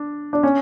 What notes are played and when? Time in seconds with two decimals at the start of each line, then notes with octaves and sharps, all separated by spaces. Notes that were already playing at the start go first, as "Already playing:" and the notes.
Already playing: D4
0.33 D4
0.43 C#4